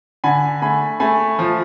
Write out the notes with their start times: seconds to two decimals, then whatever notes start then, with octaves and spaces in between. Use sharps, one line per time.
0.24 D3 G#5 B5
0.62 A3 G#5 B5
1.00 A3 G#5 B5
1.39 F3